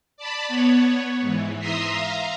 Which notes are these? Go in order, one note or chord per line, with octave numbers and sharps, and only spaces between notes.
D5 A5 B5
B3 C#5
G#2 E3
E5 A#5 C6 D#6
F5 A#5